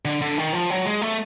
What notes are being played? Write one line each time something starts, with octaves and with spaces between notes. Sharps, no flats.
D3
D3
D#3
F3
F#3
G#3
A3